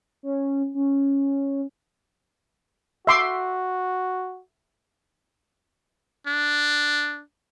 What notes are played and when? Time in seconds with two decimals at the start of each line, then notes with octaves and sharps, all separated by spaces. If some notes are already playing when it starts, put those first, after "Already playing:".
0.23 C#4
0.75 C#4
3.07 F#4 E5 C6 D6
6.27 D4